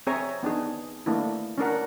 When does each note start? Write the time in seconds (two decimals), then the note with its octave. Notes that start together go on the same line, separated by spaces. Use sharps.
0.07 C4 G#4 C#5 E5 G#5 A#5
0.43 B3 D4 D#4 G#4
1.06 A3 A#3 D4 E4
1.58 C#4 D4 A#4 F#5